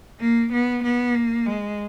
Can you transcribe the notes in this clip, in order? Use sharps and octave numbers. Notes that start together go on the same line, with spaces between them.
A#3
B3
B3
A#3
G#3